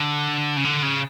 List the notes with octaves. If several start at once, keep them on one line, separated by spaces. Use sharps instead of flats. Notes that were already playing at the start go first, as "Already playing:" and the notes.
Already playing: D3
C#3
D3
C#3